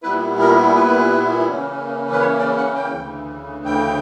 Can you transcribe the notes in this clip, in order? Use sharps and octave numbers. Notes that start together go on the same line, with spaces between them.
A#2 G3 B3 E4 B4
A#4
B4
C#3 E3 A#3 C#4
B4
C#5
D5
F#5
G5
D2 C#3 E3
G5